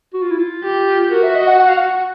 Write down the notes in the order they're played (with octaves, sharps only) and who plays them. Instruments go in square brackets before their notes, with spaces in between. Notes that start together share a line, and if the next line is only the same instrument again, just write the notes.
[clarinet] F#4
F4
E4
F4
[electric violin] G4
[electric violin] F#4 [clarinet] A#4
[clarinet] E5
D#5
F#5
F#5
F5
F#5